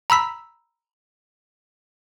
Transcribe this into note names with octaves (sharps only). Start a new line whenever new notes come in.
A#5 B5 E6 B6